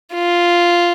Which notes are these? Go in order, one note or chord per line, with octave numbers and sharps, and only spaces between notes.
F4